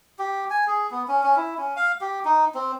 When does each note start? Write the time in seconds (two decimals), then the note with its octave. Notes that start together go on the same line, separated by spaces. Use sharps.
0.19 G4
0.50 G#5
0.67 G#4
0.91 B3
1.08 C#4
1.23 C#4
1.36 E4
1.58 C#4
1.76 F5
2.01 G4
2.25 D#4
2.55 C4